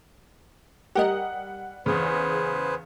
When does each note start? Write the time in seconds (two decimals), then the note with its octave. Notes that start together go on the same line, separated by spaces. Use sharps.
0.95 G3 G4 A#4 D#5 F#5
1.86 E2 C#3 G#4 B4 C5